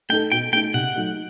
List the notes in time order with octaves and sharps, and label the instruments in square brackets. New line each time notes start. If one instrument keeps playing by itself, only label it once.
[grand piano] A3 D#4 A4 [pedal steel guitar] G5
[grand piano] B2 [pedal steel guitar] G5
[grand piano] A3 D#4 A4 [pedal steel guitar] G5
[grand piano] C3 [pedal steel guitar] F#5
[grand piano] F#3 A3 D#4